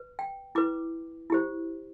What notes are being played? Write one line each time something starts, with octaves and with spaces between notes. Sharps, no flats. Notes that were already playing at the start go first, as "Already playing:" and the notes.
Already playing: B4
G5
E4 B4 D6
E4 G4 C5